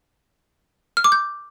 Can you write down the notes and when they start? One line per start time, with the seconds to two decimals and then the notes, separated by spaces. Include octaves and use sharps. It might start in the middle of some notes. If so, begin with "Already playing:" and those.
0.97 F6
1.04 D6
1.12 G6